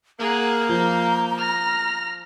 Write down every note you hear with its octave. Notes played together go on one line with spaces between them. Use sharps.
A#3 G#4 F#5 A#5
F3 G6
F6 A#6